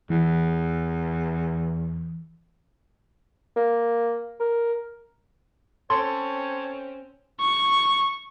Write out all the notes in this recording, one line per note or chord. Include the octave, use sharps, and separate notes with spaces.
E2 E3
A#3
A#4
C4 C#4 A4 C#5 C6
C#6